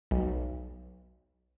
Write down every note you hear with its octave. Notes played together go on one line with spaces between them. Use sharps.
B1